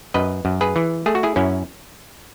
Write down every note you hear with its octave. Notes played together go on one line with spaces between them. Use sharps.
F#2 B4 D#5
F#2
G#4 B4
E3
A3 G#4
F#4
E4 G#4
F#2 C#4 E4